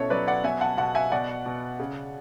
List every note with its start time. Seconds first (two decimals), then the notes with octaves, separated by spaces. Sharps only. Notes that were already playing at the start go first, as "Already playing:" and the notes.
Already playing: B2 C#4 E4 A4 C#5
0.10 F#3 B4 D5
0.27 D5 F#5
0.44 B3 E5 G#5
0.61 F#5 A5
0.78 B2 F#5 A5
0.95 E5 G#5
1.12 B2 D5 F#5
1.46 B2
1.79 C#3